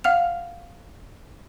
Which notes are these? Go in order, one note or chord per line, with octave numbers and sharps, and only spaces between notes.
F5 F#5 F6 F7